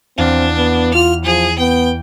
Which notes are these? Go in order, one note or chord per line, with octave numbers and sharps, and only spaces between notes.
E2 C4 D4 F5
B3
F4 F6
F3 G#4
B3 G5